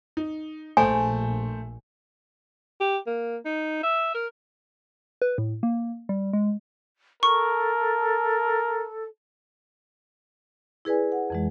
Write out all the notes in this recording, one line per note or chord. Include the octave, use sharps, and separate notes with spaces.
D#4
A#1 A3 C5 G#5
G4
A#3
D#4
E5
A#4
B4
A2
A#3
G3
G#3
A4 A#4 C#6
E4 G#4 B4 D5 G#5
F#5
F2 E3 G#3